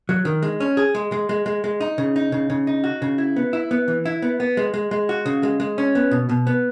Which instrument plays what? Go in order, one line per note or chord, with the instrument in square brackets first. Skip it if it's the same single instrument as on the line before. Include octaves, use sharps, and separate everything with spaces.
[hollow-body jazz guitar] F#3
D#3
G#3
C#4
G#4
G#3
G#3
G#3
G#3
G#3
D#4
C#3
D#4
C#3
C#3
D#4
F#4
C#3
E4
B3
E4
B3
E3
E4
B3
B3
G#3
G#3
G#3
F#4
C#3
G#3
G#3
C#4
B3
B2
B2
B3